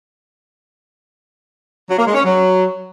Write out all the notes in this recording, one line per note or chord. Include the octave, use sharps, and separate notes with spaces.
F#3
A#3
G#3
C#4
F#3